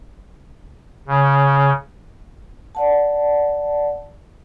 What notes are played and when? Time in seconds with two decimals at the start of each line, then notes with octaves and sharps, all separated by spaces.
1.08 C#3
2.75 D5 F#5 A5